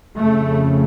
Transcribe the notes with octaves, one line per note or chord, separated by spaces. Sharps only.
F2 C#3 A3